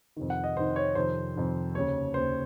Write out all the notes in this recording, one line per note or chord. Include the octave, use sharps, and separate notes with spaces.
F2 C3 D#3
F#5
D#5
F2 C3 D#3 C5
C#5
F2 C3 D#3 C5
F2 C3 D#3
D#2 C#3 C#5
D#2 C#3 C5